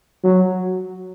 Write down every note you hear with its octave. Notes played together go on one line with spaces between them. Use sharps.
F#3